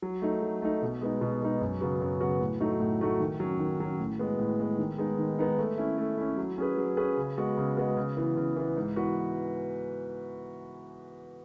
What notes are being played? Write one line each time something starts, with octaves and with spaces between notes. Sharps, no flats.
F#3
A3 D#4
F#3
A3 D#4
B2
G#3 B3 D#4
B2
G#3 B3 D#4
F#2
C#3 F#3 B3 F#4
F#2
C#3 F#3 B3 F#4
A2
F#3 A3 D#4 F#4
A2
F#3 A3 D#4 F#4
D#3
F#3 C#4
D#3
F#3 C#4
A2
G#3 B3
A2
G#3 B3
D#3
G#3 B3 D#4
D#3
G#3 B3 D#4
A3
C#4 E4
A3
C#4 E4
F#3
C#4 G#4 B4
F#3
C#4 G#4 B4
C#3
G#3 B3 F#4
C#3
G#3 B3 F#4
C#3
E3 B3
C#3
E3 B3
G#2
E3 B3 F#4 B4